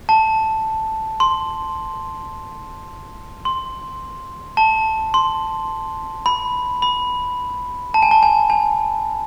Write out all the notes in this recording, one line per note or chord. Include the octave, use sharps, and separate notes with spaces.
A5
C6
C6
A5
C6
B5
B5
A5
G#5
A5
G#5
G#5